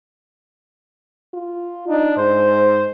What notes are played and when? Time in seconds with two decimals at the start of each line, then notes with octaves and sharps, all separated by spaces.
1.34 F4
1.89 D4 D#4
2.17 G#2 C5